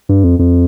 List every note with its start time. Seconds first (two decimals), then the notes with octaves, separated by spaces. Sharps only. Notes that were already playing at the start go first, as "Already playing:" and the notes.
0.09 G2
0.24 F2
0.39 F2